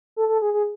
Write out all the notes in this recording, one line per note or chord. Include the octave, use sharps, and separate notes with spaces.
A4
A4
G#4
G#4